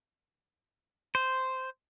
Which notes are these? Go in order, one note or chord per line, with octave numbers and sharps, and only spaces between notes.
C5